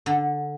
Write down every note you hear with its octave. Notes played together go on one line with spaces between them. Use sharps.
D3